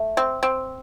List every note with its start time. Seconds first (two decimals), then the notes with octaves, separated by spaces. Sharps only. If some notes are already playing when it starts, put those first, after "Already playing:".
Already playing: A3
0.17 C4
0.43 C4